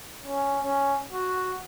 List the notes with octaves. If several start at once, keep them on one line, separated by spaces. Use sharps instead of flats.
C#4
C#4
F#4